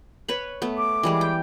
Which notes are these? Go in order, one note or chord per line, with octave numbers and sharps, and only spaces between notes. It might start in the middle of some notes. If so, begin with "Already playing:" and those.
B4 C#5 B5
A3 B3
D6
E3 G3 G#3
G5